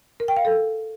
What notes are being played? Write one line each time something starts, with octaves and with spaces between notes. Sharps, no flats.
A#4
G5
F5
A4